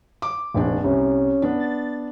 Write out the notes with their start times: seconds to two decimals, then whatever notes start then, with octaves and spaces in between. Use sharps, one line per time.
0.22 D6
0.54 F1 A#1 D4
0.84 C2 C#4
1.42 B3 D4
1.60 A6